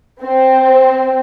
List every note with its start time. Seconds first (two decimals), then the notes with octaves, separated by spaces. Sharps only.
0.22 C4